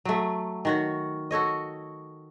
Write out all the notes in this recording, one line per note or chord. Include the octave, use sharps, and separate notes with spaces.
F#3 A3
D#3 F#4 C#5
F#4 A4 C#5 D#5